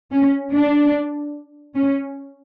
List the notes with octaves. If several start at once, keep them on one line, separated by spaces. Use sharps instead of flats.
C#4
D4
C#4